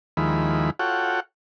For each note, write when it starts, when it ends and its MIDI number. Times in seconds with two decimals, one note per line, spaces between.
0.17 0.70 39
0.17 0.70 51
0.17 0.70 53
0.17 0.70 56
0.17 0.70 64
0.17 0.70 83
0.79 1.20 65
0.79 1.20 66
0.79 1.20 69
0.79 1.20 73
0.79 1.20 78
0.79 1.20 79